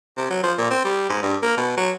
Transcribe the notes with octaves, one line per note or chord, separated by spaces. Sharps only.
C3
F#3
F3
A#2
C4
G3
G#2
G2
A#3
B2
F#3